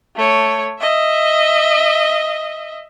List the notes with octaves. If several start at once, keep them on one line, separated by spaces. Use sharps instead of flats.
A3 C#5
D#5 E5